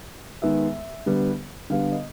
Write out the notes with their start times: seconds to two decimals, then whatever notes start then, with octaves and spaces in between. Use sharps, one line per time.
0.42 D#3 G#3 B3 E5
1.06 D3 G3 B3
1.70 D3 G3 B3 F5
1.91 D#5